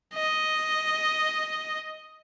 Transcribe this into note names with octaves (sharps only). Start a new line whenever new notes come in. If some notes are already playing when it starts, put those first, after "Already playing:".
D#5